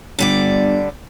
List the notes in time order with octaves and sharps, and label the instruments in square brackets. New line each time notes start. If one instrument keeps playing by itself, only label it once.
[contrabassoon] G1 [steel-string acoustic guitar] D3 G3 D5